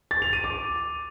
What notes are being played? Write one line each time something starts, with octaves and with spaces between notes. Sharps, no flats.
A6
F7
D#7
D6